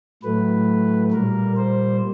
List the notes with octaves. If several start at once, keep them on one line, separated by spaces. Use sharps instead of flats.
A2 F#3 A3 B4
A#2 G3 A#3 A#4
C5